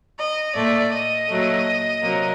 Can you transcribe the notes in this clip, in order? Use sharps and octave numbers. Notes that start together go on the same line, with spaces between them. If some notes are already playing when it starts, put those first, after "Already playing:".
D#5
A#2 A3 D5
D#5
A#2 F#3 A3
C3 F#3 A#3